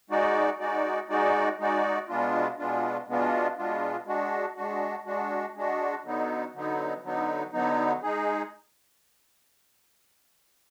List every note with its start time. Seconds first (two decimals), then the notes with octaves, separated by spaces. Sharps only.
0.10 G#3 D#4 F#4 D5
0.60 G#3 D#4 F#4 D5
1.09 G#3 D#4 F#4 D5
1.59 G#3 D#4 F#4 D5
2.08 B2 G#3 B3 D4 F4
2.58 B2 G#3 B3 D4 F4
3.08 B2 G#3 B3 D4 F4
3.58 B2 G#3 B3 D4 F4
4.06 G#3 D4 F#4
4.56 G#3 D4 F#4
5.06 G#3 D4 F#4
5.55 G#3 D4 F#4
6.04 D3 F#3 B3 D#4
6.54 D3 F#3 B3 D#4
7.03 D3 F#3 B3 D#4
7.53 D3 F#3 B3 D#4
8.03 G#3 D#4 G#4